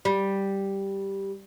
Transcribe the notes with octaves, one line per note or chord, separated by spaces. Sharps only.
G3